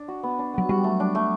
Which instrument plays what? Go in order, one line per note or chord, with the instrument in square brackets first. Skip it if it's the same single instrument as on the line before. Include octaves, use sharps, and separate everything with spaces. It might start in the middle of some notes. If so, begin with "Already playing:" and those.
Already playing: [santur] D4
F#4
B3
D4
[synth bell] F#3 [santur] B3
[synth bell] G3 [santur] F#4
[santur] A3
D4
A3